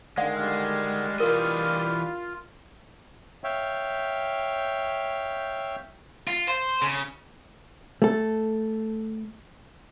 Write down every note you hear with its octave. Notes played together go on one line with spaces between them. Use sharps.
D3 D#3 G#3 D5 F5 F#5
G3 D4 F6
E3 F4 A#4 D#5
C#5 E5 F5 G5
F4
C5
C#3
A3 A4